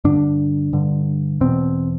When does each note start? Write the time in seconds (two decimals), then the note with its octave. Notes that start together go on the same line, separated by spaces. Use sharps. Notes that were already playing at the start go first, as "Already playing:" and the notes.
0.04 G2 D3 D4
0.73 G2 D3
1.41 E2 B2 C4